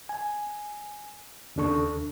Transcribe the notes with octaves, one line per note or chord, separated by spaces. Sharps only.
G#5
D#2 C#3 D4 A4 C#6